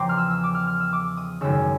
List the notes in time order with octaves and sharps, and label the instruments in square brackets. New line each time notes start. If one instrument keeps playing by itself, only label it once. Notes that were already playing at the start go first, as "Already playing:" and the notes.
Already playing: [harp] E2 C#3 F3 G5 A#5 C6 D6
F6
E6
E6
D6
F6
F6
E6
D6
D#6
G#1 F#2 C#3 E6